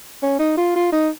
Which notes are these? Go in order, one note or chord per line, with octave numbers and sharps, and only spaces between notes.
C#4
D#4
F4
F4
D#4